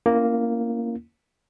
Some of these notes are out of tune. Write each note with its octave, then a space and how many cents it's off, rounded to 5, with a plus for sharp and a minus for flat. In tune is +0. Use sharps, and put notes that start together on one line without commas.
A#3 +0 C#4 +0 E4 +25